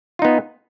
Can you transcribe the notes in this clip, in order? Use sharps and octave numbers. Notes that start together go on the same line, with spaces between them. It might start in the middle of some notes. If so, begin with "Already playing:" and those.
B3 D#4 F4